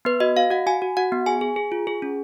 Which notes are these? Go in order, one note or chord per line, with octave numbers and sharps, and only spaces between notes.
B3 B4
F#4 D#5
F#4 F5
F#4 F#5
F#4 G#5
F#4
F#4 F#5
B3
G#4 G#5
G#4
G#4
F4
G#4
C#4